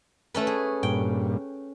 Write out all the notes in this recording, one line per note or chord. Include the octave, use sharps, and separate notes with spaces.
A3 C#4 B4
G#4
G2 A#2 G5